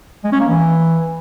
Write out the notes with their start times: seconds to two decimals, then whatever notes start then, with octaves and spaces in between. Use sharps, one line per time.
0.24 G#3
0.32 C#4
0.40 A#3
0.48 E3